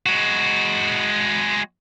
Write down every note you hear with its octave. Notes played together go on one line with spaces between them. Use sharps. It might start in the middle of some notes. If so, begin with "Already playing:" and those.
G#3 F#4